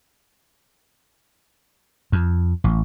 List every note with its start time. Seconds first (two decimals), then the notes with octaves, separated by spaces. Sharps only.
2.12 F2
2.64 A1